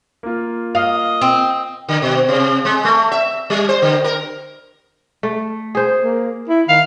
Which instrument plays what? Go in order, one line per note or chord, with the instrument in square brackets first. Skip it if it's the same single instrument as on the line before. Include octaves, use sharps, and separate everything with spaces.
[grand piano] A#3 F4
[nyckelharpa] D#5 [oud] F5
[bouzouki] C4
[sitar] D3
B2
C3
G#3
A3
E5
G3
C5
D3
A#4
[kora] A3
G#4 C5
[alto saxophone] A#3
E4
[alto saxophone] D#3 [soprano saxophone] F5